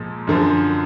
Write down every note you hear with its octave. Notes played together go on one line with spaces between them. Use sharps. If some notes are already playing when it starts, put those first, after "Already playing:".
Already playing: A#2 F3 G#3
F#2 D3 F3